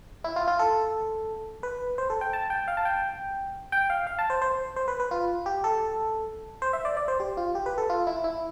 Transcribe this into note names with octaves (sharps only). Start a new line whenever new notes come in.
E4
F4
F4
A4
B4
C5
A4
G5
A5
G5
F5
A5
G5
G5
F5
F5
A5
C5
C5
C5
B4
B4
F4
G4
A4
C5
E5
D5
D5
C5
G4
F4
G4
B4
A4
F4
E4
E4